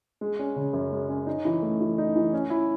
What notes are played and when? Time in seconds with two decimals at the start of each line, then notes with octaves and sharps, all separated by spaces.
0.21 G#3
0.39 C#4
0.56 C#3
0.73 F#2
0.92 G#3
1.09 C#4
1.27 D#4
1.45 E3
1.62 A3
1.80 E3
1.98 D#4
2.16 E3
2.33 C#4
2.50 E4